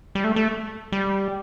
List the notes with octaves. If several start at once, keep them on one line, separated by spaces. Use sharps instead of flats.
G3
A3
A3
G3